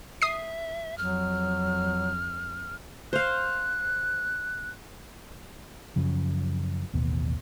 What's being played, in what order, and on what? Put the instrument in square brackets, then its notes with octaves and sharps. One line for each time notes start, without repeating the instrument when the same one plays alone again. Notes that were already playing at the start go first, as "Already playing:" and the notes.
[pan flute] E5 [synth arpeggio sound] D#6 C7
[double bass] F2 [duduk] F#3 [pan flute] F6
[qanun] C5 F5 [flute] F#6
[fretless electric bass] F#2 C#3 F3
A1 D#2 B2